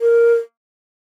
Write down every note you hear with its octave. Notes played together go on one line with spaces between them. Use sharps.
A#4